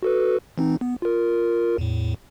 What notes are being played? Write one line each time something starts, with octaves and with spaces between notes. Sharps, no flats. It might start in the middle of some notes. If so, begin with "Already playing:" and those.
F#4 A4 B4
E3 C4 D#4
B3
F4 A#4
E2 A2